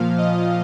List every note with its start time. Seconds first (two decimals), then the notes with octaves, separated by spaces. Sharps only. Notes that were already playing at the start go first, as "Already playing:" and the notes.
Already playing: A#2 F3 F5
0.18 D#5